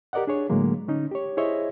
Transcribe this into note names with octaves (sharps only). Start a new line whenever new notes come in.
G4 A#4 D5 D#5 F#5
D4 G#4 C#5
A2 D3 F#3 G#3 A#3
D3 C#4 D#4
G4 C#5
E4 G#4 C5 C#5 D#5 E5